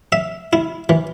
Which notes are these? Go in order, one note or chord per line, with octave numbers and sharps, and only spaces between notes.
E5
E4
E3